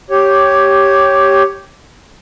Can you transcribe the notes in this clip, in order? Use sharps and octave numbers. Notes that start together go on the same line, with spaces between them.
G4 C#5